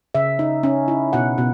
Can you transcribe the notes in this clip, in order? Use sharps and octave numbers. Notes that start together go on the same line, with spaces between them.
C#3 E5
D#4
C#4
E4
B2 F#5
B2